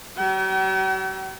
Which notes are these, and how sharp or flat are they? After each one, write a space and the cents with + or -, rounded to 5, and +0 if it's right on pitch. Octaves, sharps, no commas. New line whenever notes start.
F#3 +45 G5 -45